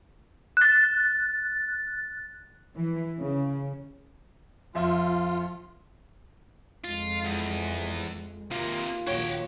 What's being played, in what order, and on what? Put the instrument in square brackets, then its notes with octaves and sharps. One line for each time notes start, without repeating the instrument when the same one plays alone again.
[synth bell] F#6 A6
[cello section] E3
C#3
[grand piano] F2 E5 [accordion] F4
[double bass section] F2 G#3 [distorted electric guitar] F4
[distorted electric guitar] E2
[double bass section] D#2 [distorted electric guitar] C3 A#3 [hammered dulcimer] F4
[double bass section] A#1 D#2 F#3 [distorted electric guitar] F#4 G5 [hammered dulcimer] C#5